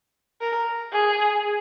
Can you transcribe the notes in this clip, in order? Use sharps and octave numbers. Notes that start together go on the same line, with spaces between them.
A#4
G#4